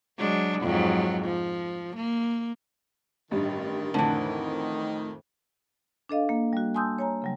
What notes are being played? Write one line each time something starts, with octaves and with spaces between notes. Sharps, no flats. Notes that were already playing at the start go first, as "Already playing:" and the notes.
F#3 G#3 D4
F2 G#2 F#3
F3
A#3
A1 G2 D#3
F2 A2 D3 E3
D4 A4 D#5 F5
A#3
G3 F#4
G#5 A5 C6 D#6 E6 G6
C#5 G#5 A#5
C#3 F#3 G3